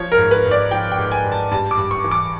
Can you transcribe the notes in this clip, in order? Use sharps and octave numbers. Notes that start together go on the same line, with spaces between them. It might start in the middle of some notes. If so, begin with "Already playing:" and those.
Already playing: F3 C#5
A#4
G#2
B4
G#2
D5
F3 G5
G5
G#2
G#5
G#2
A5
G2 A5
D6
G2
C#6
E3
D6